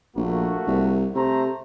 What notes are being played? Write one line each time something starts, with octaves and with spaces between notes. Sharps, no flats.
A#1 A3 A#3 F#4
C2
C3 A3 C5 A#5